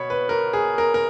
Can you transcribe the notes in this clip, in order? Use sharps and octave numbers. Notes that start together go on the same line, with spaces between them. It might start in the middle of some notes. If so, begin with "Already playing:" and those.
Already playing: B2 C#5 B5
B4
A#4
G#4
A#4
A#4